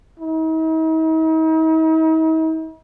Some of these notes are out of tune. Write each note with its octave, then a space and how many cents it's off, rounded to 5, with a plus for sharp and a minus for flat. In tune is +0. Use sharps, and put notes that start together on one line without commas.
D#4 +45